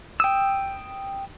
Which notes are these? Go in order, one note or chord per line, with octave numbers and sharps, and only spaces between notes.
G5 D#6 E6